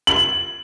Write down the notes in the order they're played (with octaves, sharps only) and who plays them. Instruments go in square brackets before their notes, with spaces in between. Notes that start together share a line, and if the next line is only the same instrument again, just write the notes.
[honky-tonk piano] F#7